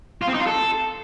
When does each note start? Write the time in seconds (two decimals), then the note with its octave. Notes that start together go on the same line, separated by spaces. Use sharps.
0.22 F4
0.28 C4
0.34 D#4
0.40 F4
0.46 A4